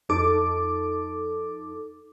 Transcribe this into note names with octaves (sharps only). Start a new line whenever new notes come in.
F2 D#4 A4 D6